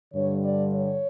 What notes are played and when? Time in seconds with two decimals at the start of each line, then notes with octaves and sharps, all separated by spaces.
0.14 G2 D3 G3 C#5
0.45 D5
0.75 C#5